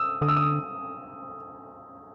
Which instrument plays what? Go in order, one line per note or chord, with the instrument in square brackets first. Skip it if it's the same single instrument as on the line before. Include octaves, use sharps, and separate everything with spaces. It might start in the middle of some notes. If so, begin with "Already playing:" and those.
Already playing: [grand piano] D#6 E6
[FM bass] D3 [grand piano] D#6
[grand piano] E6
D#6